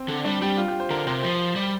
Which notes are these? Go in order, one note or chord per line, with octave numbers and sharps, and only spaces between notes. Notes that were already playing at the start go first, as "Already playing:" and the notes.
Already playing: C4
D3
G3 D4
G3 G4
F4
G4
C5
D3 A#4
C3 C5
F3 C5
G3